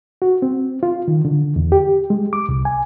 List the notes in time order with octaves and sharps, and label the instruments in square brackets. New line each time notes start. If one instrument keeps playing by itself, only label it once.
[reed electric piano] F#4
C4
F4
D#3
D3
E2
G4
G#3
D6
C2
G#5